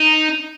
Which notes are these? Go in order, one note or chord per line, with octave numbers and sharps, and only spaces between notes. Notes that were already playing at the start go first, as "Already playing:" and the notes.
Already playing: D#4